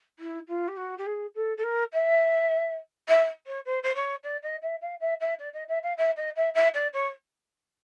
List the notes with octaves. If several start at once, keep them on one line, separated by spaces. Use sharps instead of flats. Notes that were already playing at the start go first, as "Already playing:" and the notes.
E4
F4
G4
F#4
G4
G#4
A4
A4
A#4
E5
E5
C#5
C5
C5
C#5
D5
D#5
E5
F5
E5
E5
D5
D#5
E5
F5
E5
D#5
E5
E5
D5
C#5